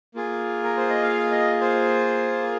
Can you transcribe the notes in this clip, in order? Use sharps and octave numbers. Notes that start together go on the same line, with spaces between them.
A#3 F4 G#4
A#4
C5
D#5
F5
D#5
C5